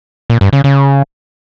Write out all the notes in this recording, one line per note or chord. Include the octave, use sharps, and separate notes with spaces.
A#2
G2
C#3
C#3